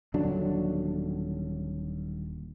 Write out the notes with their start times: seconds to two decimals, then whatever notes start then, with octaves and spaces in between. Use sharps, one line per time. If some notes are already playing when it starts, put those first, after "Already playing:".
0.14 D#1 D3 F#3 D4